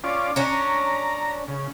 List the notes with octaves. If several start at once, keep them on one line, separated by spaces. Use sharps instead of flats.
C#4 F4 D5
C#4 D4 A#5
C#3